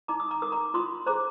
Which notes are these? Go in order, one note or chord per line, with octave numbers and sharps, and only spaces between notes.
D#4 A#5 D6
D#6
A#5 D6
A#4 D#6
A#5 D6
F4 C6 D#6
G#4 C5 A#5 D6